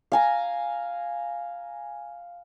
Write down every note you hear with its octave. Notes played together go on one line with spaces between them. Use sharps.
F5 G#5 A#5